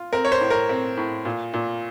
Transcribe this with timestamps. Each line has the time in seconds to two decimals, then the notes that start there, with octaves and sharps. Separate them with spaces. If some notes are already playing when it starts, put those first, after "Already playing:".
Already playing: F4
0.13 C4 A#4
0.25 C#5
0.32 C5
0.41 A2
0.50 A#4
0.69 C4
0.97 A2
1.25 A#2
1.54 A#2